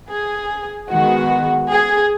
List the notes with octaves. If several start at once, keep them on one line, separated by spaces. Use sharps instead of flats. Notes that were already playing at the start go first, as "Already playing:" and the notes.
G#4
D#3 G#3 B3 F#4
G#4